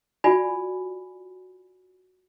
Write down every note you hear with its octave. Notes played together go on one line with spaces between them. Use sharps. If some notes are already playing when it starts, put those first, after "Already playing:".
F4 F#4 D5 G#5 B5